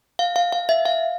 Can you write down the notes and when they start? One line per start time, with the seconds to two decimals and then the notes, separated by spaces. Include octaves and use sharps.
0.19 F5
0.36 F5
0.52 F5
0.69 E5
0.85 F5